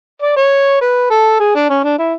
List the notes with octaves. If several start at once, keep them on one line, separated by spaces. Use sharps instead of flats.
D5
C#5
B4
A4
G#4
D4
C#4
D4
E4